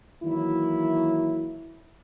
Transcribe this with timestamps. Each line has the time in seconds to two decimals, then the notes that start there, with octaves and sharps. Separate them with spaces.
0.23 D#3 E3 F#3 A#3 E4